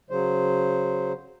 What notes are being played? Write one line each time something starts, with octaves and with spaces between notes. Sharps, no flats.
C#3 F#3 C5